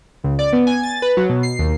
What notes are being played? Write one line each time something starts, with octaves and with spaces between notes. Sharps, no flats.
C#2
D5
B3
G#5
A6
B4
F#3
B2
C7
D#2